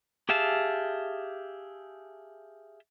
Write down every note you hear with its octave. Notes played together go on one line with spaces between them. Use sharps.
G4 G#4 E5 F5 A5